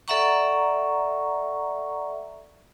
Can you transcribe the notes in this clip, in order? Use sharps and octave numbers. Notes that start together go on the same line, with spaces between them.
A4 D5 E5 F#5 A#5 C#6